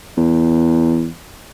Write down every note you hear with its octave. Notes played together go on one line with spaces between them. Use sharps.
E2